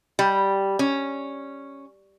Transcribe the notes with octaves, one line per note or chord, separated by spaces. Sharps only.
G3
C#4